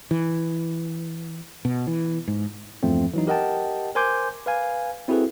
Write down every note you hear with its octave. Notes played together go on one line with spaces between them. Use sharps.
E3
B2
E3
G#2
E2 G2 F3 A3 C4
E3 F#3 D#4
G4 A#4 D#5 F#5 G5 A5
A#4 C5 G#5 C6 D6 G6
B4 F5 G#5
C4 E4 F#4 G#4 A4 B4